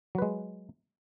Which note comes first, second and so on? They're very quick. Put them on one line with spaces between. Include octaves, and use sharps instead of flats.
F#3 B4 G#3